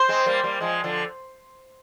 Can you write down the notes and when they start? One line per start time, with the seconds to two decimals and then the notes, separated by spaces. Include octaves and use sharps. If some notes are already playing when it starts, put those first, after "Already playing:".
Already playing: C5
0.09 G#3 C4
0.26 G3 A#3
0.44 G3 A#3
0.61 F3 G#3
0.84 D3 F3